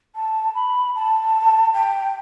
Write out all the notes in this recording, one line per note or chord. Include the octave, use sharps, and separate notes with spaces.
A5
B5
A5
G5